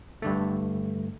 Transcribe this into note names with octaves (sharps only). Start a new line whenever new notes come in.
G2 D3 A3